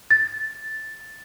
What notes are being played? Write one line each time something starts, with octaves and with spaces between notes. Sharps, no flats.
A6